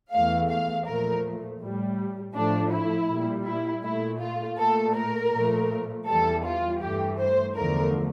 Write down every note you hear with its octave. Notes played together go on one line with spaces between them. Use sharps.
E2 E3 A3 F5
F5
A#2 F3 A3 A#4
A2 G3
A2 F3 A3 D4
E4
A#2 G3
E4
A#2 A3 E4
F4
A#2 A3 A4
A#4
A#2 F3 A3
E2 E3 G3 A4
F4
G2 E3 A3 G4
C5
E2 D3 F3 A3 A#4